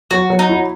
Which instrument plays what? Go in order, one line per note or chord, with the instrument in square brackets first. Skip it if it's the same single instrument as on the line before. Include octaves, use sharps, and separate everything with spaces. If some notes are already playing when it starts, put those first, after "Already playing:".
[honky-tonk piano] F#3 [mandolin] F#4
[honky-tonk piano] F#3
[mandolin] D#4
[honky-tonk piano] E4